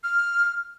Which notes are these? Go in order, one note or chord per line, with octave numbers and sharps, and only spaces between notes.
F6